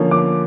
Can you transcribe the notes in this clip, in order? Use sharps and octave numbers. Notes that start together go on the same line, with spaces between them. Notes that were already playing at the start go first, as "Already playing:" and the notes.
Already playing: D3 F3 A#3 C#4
D6